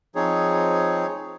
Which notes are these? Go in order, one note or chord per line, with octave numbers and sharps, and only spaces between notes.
F3 C4 D#4 G#4 C#5